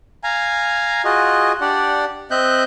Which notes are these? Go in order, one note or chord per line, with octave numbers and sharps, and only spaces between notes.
F5 G#5 A#5
F4 F#4 G#4 D#5
D4 G4 D5 F#5
C4 D#5 E5 F#6 G6